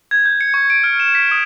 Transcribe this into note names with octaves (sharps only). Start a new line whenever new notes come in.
G#6
G6
C#7
C#6
D7
F6
E7
B6
D#6